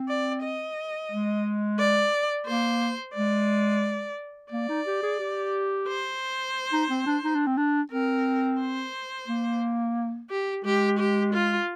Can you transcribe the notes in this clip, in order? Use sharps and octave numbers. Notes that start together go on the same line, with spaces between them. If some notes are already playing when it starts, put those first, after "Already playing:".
Already playing: C4
D5
D#5
G#3
D5
A#3 C5
G#3 D5
A#3 D5
D#4
G4
G#4
G4
C5
D#4
C4
D4
D#4
D4
C4
D4
C4 A#4
C5
A#3
G4
G#3 G4
G4
F4